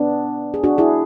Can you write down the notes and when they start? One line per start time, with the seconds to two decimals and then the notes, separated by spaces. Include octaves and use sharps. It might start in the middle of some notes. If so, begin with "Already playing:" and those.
Already playing: B3 D4
0.54 G#4
0.64 D4 F#4
0.78 E4 G#4